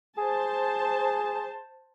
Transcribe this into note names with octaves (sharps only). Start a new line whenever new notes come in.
G#4 C5 A5